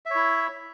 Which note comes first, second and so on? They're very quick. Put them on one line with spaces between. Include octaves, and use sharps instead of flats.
E5 C#5 E4